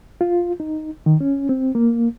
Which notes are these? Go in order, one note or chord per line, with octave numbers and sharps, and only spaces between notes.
F4
D#4
D#3
C#4
C4
A#3